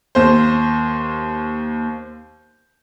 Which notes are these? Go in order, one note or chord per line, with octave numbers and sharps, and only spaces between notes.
D#2 C5